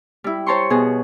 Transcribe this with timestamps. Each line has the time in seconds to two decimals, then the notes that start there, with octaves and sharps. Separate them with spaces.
0.24 G3 E4
0.46 C5 C#5 A5 A#5 C6 C#6
0.70 B2 G#4